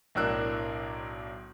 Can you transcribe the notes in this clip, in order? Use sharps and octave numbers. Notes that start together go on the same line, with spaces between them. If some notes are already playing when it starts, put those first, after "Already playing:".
B1 A2 D4 A#4 E6 F#6